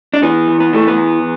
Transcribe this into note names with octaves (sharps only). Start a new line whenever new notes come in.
D4
E3 B3
E2
B3
E3 A3
B3
E2